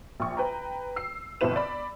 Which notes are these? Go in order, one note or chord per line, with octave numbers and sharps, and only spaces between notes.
A#1 C#6
B4 G5 A#5
E6 C7
G1 F2 B2 E4 B4 E7
D5 B5